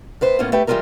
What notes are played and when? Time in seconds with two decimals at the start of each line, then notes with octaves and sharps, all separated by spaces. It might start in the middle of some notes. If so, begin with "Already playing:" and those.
0.21 A2 B4 C5
0.39 A2 A#3 B3 C#4 F4
0.52 A3 G4 B4 G5
0.67 E3 G3 G#3 F4 A4 A#4